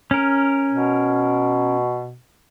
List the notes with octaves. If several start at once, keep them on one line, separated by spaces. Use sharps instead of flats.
C#4 A#4
B2